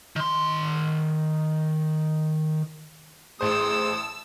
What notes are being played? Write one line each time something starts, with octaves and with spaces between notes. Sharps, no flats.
D#3 C6
A1 G#4 C5 A5 D#6 E6